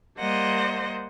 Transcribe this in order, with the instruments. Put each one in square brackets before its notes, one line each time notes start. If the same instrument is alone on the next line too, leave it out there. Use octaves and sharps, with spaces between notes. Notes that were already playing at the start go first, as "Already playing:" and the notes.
[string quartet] G3 A#3 C5 D#5 F#5